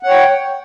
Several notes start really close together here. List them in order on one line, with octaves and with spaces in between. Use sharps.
F#5 C#5 G5